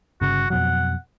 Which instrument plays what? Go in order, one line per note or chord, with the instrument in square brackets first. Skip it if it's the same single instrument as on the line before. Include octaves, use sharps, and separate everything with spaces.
[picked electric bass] G1 C#3 [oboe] F#4
[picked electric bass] F2 B2 F#3 [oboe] F#5